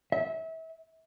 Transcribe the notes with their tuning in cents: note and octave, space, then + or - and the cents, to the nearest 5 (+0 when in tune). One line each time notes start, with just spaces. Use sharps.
E5 -30